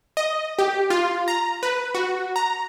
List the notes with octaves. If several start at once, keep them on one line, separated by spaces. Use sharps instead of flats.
D#5
G4
F4
A#5
B4
F#4
A#5